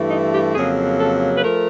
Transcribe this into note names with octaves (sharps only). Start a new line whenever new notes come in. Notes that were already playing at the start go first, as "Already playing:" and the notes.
Already playing: G2 E3 A3
D#4
G4
F2 C#3 F#3 A#3 G#4
A4
B4
F3 A3 A#4